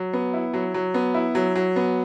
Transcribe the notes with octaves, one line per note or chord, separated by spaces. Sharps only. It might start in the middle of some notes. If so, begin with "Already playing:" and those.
Already playing: F#3
B3
E4
F#3
F#3
B3
E4
F#3
F#3
B3